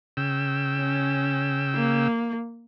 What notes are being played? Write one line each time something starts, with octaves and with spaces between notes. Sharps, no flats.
C#3 G5 E6
C#4
A#3